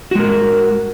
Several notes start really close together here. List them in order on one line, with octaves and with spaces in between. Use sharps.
F#4 G#3 A#4